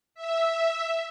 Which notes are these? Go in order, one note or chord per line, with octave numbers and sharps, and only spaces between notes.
E5